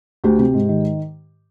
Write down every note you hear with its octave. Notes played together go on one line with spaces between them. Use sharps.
D2 G4
C3 G4
G#2
D#3